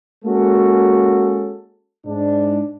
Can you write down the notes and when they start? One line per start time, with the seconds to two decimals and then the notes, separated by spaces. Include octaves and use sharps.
0.25 G#3 A#3 C#4 F#4 A4
2.06 G#2 D4